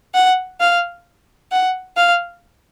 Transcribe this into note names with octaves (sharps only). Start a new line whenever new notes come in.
F#5
F5
F#5
F5